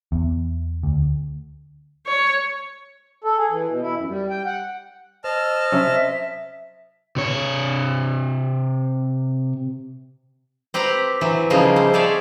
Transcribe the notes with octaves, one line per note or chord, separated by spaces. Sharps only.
E2
D2
C#5
A4
G#4
E3
B2
E4
F#2
G3
G5
F#5
C5 D#5 A5 E6 F6
C3 F#3 C#4 E5
C3 C#5
C4 G4 B4 A#5
E3 F#3
C#3 F3 G3 A#3 D#4
C4
G#4 A4 C#5 D5 E5 F5